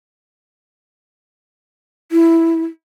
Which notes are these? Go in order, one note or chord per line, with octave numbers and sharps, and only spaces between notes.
E4